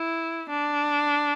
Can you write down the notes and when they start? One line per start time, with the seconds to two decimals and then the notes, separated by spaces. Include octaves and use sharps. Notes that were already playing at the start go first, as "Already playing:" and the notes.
Already playing: E4
0.49 D4